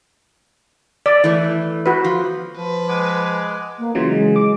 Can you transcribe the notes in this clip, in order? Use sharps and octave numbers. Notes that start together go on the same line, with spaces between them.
D5
E3 A3
F#4 B4
F3
F3 B4
G#3 F#5 G#5 D6
A#3
C#3 E3 F#3 F4
G#3
D6